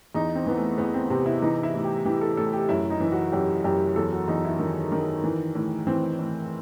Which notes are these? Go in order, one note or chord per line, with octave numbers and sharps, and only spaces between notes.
E2 D#4
C4
E3 B3
A3
E2 B3
C4
C3 C4
E4
E3 D#4
E4
A2
G4
E3 G4
A4
A2 A4
G4
F#2 E4
D#4
E3
F#4
F#2 G4
F#2 G4
E2 A4
F#4
E2 D#4
E4
D#3
D#3
E3
A2
E3 C4
A2